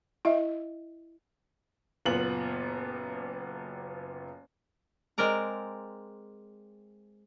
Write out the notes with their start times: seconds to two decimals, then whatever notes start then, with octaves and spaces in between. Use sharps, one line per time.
0.25 E4 D#5 E5
2.06 F#1 A#2 B3 F#7
5.18 G#3 C4 A#4 D5 A#5